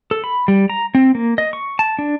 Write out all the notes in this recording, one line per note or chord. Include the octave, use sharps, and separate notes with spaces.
A4
B5
G3
A#5
C4
A#3
D#5
C#6
A5
D4